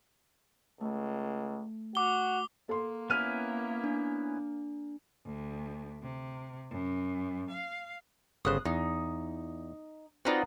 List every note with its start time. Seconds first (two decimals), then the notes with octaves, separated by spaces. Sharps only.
0.80 C#2 A3
1.95 F#4 D6 G7
2.69 A#3 A4 C6
3.10 B3 C#4 E4 F6 D#7
3.84 D4
5.25 D2
6.02 C3
6.70 F#2
7.51 F5
8.45 G1 C#3 C5 D#6 F#6
8.65 E2 D#4
10.25 C4 D#4 F4 F#4 B4 D5